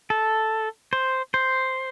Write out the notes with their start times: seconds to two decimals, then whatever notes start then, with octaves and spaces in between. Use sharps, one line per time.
0.10 A4
0.93 C5
1.34 C5